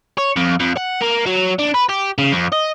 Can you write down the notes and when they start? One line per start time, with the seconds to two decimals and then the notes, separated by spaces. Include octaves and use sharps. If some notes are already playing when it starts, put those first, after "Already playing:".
0.18 C#5
0.36 F2
0.60 F2
0.77 F#5
1.01 A#3
1.26 F#3
1.59 D4
1.74 B4
1.89 G4
2.18 C#3
2.32 F2
2.53 D#5